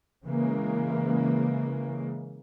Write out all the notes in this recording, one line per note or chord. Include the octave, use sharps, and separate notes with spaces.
C#3 E3 G#3 A#3